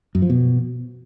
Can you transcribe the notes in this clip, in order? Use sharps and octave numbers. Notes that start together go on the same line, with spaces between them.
F#2
F3
B2